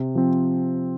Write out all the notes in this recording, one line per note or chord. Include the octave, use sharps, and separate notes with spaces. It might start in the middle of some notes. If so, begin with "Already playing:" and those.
Already playing: C3
F3 C4